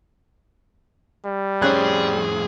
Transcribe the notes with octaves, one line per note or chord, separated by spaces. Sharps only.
G3
F2 A2 C#4 G#4 C5 F#6